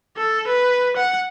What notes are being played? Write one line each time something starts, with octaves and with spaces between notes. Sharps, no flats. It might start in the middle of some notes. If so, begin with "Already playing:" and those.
A4
B4
F#5